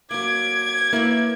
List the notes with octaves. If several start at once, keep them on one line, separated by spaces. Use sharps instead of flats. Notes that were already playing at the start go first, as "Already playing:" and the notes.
F#3 A#3 D6 G#6
A#3 E4 B4 C#5